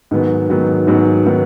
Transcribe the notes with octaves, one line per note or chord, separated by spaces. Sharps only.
G#2 D#3 F#3 B3
G#2 D#3 F#3 B3
G#2 D#3 F#3 B3
D#3 F#3 B3